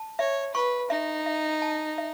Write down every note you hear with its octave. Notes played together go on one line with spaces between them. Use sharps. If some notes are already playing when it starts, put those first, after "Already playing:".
Already playing: A5
C#5 E5
B4 C#6
D#4 E5
E5
A5
E5